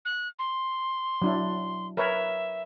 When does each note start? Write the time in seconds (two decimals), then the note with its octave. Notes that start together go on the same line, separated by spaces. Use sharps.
0.05 F#6
0.39 C6
1.22 F#3 D4 E4
1.97 A#4 B4 C#5 E5